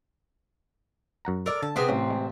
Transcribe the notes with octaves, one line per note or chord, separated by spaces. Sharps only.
F#2 F#5 A#5
A4 A#4 D5
D3 A5
C3 B3 C4 G#4
A1 C#4
G#3